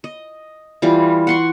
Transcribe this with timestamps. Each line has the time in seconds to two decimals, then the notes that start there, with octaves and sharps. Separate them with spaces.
0.04 D#5
0.82 E3 G3 F4
1.27 F#5 C6 C#6